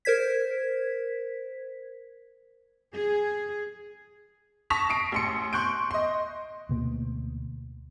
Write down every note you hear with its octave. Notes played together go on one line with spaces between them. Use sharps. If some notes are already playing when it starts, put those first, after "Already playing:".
A#4 C5 G#6 B6
G#4
A5 C#6 D#6 A#6 B6 F7
D#6 C7 D7
A1 C6 C#7
C6 C#6 F#6 G6 D7
D#5 C6
D2 B2 A#3